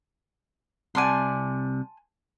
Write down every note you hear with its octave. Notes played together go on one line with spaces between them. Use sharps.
C2 C3 D5 G#5 A5 C6